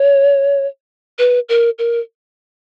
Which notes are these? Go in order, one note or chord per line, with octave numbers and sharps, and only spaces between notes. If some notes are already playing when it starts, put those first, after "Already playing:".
Already playing: C#5
B4
A#4
A#4